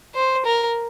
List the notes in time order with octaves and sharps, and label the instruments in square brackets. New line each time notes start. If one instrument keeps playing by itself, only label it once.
[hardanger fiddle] C5
A#4